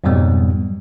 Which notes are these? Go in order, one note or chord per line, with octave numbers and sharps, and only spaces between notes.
F2 G#2 B2 F#3 G3 B3